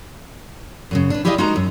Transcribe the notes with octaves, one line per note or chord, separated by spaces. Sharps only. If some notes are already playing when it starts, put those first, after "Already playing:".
F#2 A#2 C#3
D4 B4
E4 G4 G#4 D5 D#5 F5
G#3 D#4 F#4 A#4 D#5 A#5
F#2